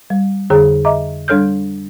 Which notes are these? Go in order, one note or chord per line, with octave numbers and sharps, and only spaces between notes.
G3
F2 D3 G#4 C#5 A#5
D#5 E5 A#5 D6
G3 D4 A4 C#5 F6 G6